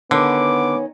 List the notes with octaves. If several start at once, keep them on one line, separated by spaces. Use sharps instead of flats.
D3 D#3 B3 C#4 D6